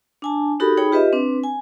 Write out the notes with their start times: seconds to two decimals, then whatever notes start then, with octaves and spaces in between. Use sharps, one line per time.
0.22 D4 G#5 A5
0.60 D#4 F#4 G4 A4 A#4 B5
0.77 D#4 G#4 C#5 G5 B5
0.92 F4 G4 B4 D#5 E5
1.13 C4 D4 B4
1.44 G#5